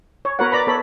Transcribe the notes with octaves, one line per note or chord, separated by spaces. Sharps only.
C#5
B3 F#4 A#4 B4 C#5 F#5
D5 A#5 B5
B3 A4 C#5 B5